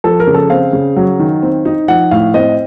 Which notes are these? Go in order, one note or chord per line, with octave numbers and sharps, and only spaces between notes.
F3 A4
A#4
C#3
A4
C4 F5
C#3
F#3
D#3
C4
D#4
F3 F#5
A2 F5
C4 D#5